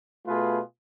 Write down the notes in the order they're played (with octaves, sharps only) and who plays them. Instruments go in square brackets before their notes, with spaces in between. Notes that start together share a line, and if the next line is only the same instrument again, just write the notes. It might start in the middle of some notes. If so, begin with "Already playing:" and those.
[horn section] B2 A3 F4 G#4 B4